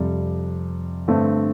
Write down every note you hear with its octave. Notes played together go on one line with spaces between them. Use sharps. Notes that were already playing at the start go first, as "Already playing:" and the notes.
Already playing: F2 C3 G3
G2 D3 A3 C4